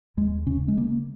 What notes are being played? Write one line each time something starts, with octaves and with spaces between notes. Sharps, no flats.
D#2 G#3
C#3 C#4
G#3
C#3 A#3